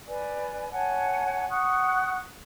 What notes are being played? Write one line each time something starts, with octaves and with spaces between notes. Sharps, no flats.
B4 D5 G#5
C#5 F#5 G#5 A5
F#5 C#6 D#6 F#6